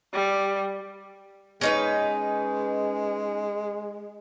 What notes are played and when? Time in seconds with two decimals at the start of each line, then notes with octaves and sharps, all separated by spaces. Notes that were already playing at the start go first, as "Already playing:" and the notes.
0.13 G3
1.61 G#3 C#4 D#4 B4